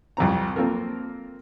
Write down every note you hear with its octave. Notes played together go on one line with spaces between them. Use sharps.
C2 F2 C3 C4 A#5
A#3 C4 F4 A4 A#4